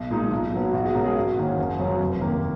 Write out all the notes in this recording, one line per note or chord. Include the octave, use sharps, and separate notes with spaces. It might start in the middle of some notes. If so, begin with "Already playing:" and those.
Already playing: B1
A#2 G#3 D#4
B1
A#2 F#3 B3
B1 F#4
G#4
B2 G#3 C#4 A#4
G#4
G#1 F#4
G#2 D#3 A#3 C#4
F#1
F#2 C#3 F#3 C#4
F1
D#2 D#3 A#3